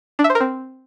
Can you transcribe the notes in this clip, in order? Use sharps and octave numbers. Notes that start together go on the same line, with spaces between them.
D4
E5
C5
A#4
C4